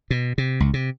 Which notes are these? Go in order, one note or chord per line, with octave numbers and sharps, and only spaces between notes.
B2
C3
C#2
C3